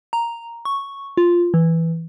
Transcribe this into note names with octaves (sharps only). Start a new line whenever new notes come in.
A#5
C#6
F4
E3